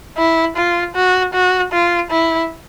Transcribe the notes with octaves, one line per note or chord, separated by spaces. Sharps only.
E4
F4
F#4
F#4
F4
E4